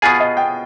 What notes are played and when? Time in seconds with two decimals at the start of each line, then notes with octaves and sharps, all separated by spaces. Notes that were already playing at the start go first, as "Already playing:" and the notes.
0.02 B2 B3 F4 G#4 G#5
0.20 D#5
0.37 G5